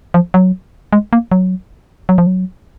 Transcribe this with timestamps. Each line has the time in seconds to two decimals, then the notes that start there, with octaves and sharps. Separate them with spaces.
0.14 F3
0.34 F#3
0.93 G#3
1.13 A#3
1.32 F#3
2.09 F#3
2.18 F3
2.27 F#3